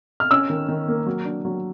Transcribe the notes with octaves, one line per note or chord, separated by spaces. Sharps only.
F6
C#4 E6
D#3
D#3
A#3
F#3
D4
F#3